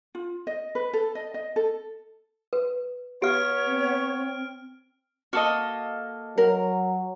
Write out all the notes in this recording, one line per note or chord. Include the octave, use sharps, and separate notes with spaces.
F4
D#5
B4
A4
D#5
D#5
A4
B4
B3 G4 C#5 F5 F6 D7
C4
A#3 F#4 A4 D#5
F#3 A#4